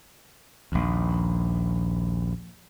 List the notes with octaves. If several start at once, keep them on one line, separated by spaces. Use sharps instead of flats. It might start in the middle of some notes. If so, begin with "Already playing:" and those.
A#1 D#2